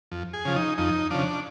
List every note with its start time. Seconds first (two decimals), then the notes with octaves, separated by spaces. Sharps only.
0.12 F2
0.33 G#4
0.45 C#3 F3
0.56 D#4
0.78 F2 D#4
1.10 C#3 F3 D4